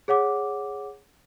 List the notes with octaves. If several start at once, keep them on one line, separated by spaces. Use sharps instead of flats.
G#4 C#5 F#5 D6